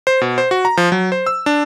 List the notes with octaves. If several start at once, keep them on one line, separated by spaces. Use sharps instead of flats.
C5
B2
C5
F#4
A#5
F3
F#3
C5
E6
D4